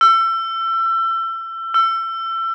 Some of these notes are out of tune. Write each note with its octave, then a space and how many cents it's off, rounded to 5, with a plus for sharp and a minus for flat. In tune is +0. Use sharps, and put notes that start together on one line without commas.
E6 +30
E6 +30